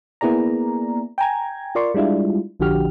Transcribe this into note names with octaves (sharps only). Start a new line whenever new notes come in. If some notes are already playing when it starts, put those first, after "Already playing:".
A#3 B3 E4 G#4 D5 A#5
G5 G#5 A#5 G#6
F4 A#4 D5 C6 C#6
G3 G#3 D4 E4 F4
A#1 D3 F3 F#4 G4 F6